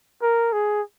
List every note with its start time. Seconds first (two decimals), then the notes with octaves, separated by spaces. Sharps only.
0.22 A#4
0.53 G#4